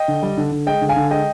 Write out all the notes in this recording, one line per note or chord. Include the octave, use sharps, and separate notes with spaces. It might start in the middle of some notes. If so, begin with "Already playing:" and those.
Already playing: D#5 G5
D3
G3
D3
D3
G#3 D#5 G5
D3
F5 G#5
D3
G#3 D#5 G5